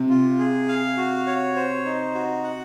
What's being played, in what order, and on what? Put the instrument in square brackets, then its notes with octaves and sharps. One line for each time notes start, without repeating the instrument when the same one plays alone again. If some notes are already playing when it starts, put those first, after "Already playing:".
Already playing: [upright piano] C3
[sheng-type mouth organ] F4
G#4
F5
F#4
C#5
C5
D#4
F#4
F#5